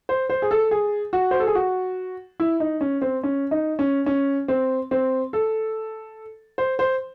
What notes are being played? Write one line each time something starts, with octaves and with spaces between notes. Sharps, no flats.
C5
C5
G#4
A4
G#4
F#4
C5
A4
G#4
F#4
E4
D#4
C#4
C4
C#4
D#4
C#4
C#4
C4
C4
A4
C5
C5